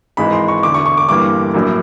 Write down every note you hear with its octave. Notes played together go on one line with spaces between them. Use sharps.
G#1 G#2 E3 G#3 B5
C6
C#6
E1 D2 D3 D6
C#6
C#6
D6
G1 G2 E3 G3 A#3 D6
A#1 A2 F#3 A#3